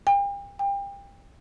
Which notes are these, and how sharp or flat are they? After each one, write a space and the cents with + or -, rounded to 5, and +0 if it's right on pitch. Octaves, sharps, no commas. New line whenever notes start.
G5 +40
G5 +30